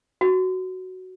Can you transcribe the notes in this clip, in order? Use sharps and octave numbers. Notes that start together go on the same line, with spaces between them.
F#4